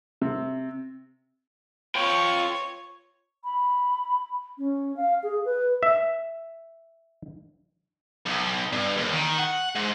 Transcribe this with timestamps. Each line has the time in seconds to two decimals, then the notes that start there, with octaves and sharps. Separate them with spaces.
0.21 C3
1.95 F4 C#5 G5
3.44 B5
4.58 C#4
4.96 F5
5.23 G#4
5.45 B4
5.83 E5
8.26 B1
8.73 G2
8.97 D#2
9.13 D#3
9.38 F#5
9.75 G#2